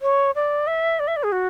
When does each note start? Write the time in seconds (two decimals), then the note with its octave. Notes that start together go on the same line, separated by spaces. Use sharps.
0.02 C#5
0.35 D5
0.67 E5
1.00 D5
1.08 E5
1.16 D5
1.23 G#4
1.32 F#4